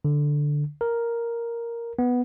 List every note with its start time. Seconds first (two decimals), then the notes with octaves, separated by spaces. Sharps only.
0.05 D3
0.81 A#4
1.99 B3